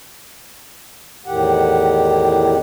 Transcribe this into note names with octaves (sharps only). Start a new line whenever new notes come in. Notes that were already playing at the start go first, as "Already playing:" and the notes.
E2 A2 D#3 G4 F#5